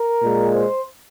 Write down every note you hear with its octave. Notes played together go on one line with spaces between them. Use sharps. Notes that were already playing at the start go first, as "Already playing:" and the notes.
Already playing: A#4
A#2 G#3
C5